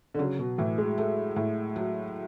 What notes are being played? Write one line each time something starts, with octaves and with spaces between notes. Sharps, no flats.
D3
C#3 F#3
B2
A2 E3
G#3
A3
A2
F#3